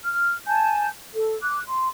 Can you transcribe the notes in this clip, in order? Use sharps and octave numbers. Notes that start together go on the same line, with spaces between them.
F6
G#5 A5 G6
A4
D6 F#6
C6